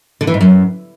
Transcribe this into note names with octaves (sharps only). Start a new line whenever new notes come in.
D3
E3
G#2
F#2